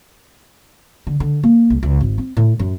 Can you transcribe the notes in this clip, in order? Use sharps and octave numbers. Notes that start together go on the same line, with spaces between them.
D3
D3
A#3
C2
C#2
G#1
C4
A2
F#2